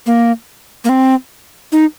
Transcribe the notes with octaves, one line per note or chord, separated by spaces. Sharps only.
A#3
A#3
C4
D#4